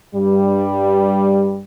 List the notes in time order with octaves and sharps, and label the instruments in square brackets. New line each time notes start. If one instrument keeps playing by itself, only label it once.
[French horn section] G2 G3